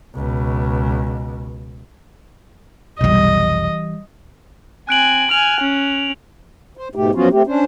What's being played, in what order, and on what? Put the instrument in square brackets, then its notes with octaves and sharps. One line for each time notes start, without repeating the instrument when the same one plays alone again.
[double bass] C#2 B2
[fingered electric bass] F1 B1 [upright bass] E3 G3 [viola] D#5
[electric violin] C4 G#5 [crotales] F#6 D7 F#7
[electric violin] G#5 F6 [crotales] F7
[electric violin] C#4
[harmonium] C5
G#2 B2 A3 G4
F3 F#3 B3 C#4 F4 F#4
A3 C4 G4
C#4 D4 C5